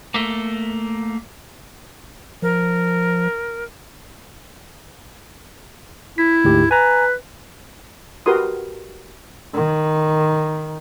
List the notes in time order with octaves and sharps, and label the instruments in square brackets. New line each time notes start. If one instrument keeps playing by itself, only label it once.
[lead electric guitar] A3 A#3
[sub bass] F3 [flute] A#4
[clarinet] E4 [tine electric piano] B6
[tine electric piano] D2 G#2 G4
[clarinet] B4 [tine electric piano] G#5 A#5
[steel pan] F#4 G4 A#4 B4 C6 D#6
[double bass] D#3